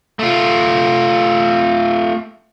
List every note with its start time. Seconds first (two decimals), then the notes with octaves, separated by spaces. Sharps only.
0.19 A3 F4